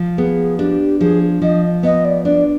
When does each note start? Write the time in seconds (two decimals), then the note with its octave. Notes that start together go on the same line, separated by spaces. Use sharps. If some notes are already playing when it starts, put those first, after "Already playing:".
Already playing: F3
0.18 B3 G#4
0.59 D4 G4
1.01 F3 G#4
1.42 F3 D#5
1.83 B3 D#5
2.05 D5
2.25 D4 D5